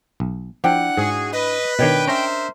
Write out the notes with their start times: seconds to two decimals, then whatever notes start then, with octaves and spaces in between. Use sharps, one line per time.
0.20 B1
0.64 F3 D4 E4 F#5 G5
0.97 G#2 F#4 G#4
1.33 B4 D#5
1.79 B2 D#3 D4 C#5 D#5 G5
2.08 C#4 A#4 C5 E5 A#5